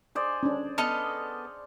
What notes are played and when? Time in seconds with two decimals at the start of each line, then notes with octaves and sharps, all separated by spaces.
0.15 G#4 C5 D5
0.43 C#4 D4
0.78 B3 A4 D#5 F6